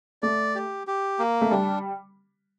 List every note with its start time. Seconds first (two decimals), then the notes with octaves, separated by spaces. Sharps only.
0.23 A3 D5
0.55 G4
0.87 G4
1.19 A#3
1.42 A3
1.51 G3 D4